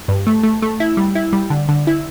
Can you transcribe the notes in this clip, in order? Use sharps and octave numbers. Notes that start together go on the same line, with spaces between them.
G2
A3
A3
A3
E4
G3
E4
G3
D3
D3
E4